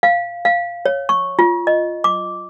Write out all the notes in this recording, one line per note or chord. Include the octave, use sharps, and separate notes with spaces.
F5
F5
C#5
C#6
F4
D#5
D6